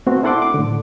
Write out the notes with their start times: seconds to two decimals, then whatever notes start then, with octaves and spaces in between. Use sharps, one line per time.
0.06 A3 B3 C4 F#4
0.23 D4 E4 A4 F#5 C6 D6
0.42 D6
0.54 A2 D3